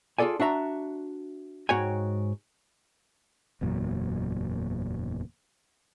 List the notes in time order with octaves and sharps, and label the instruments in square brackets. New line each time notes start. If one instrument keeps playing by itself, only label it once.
[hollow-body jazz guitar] F4 G#4 A4 D5 G#5
D4 F#4 E5 A#5
G#2 F#4 C#5 G5 G#5
[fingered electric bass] F#1 E2 A#2 F#3